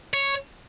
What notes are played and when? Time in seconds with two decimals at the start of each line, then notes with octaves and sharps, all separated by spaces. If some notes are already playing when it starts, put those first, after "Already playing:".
0.14 C#5